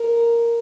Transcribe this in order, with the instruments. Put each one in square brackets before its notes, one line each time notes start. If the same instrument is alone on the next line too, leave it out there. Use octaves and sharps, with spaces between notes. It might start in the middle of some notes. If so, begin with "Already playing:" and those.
Already playing: [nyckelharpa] A#4